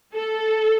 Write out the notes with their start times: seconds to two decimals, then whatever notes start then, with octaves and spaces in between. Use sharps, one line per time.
0.15 A4